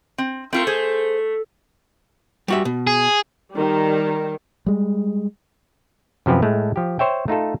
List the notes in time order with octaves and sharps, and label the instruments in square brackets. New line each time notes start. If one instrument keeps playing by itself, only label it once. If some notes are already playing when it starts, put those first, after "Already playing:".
[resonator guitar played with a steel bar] C4
[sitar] A3 [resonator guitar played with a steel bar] C4 F4 A#4
[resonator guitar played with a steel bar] G#4 C5
[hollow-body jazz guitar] G3 F#4 E5
B2
[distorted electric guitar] G#4
[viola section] D#3 G3
[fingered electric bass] G3 G#3
[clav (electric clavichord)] F#2 C3 F3 G4 B4
A2 G#3 A3
F3 G4
C5 C#5 E5 G5
A3 D#4 F4 A4